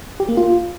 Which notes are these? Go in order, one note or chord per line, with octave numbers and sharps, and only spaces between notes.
G4
A#3
F4